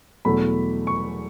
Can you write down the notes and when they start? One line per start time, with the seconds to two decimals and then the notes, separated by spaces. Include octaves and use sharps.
0.25 E2 B2 F#3 A3 B5
0.87 C#6